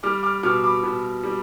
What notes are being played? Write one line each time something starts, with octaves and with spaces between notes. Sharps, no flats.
G3 D6 F6
D6 F6
B2 D6 F6
B5 D6
B2
G3